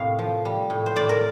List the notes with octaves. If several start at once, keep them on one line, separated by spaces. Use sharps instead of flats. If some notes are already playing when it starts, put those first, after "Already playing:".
Already playing: A2 C3 A#3 F5 G5
F3
G3
A2
C5
A2 D5
A#4